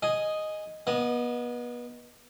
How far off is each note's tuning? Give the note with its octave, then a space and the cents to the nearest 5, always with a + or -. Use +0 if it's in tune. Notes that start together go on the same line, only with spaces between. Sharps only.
G#4 +0 D#5 +0
B3 -30 D#5 +0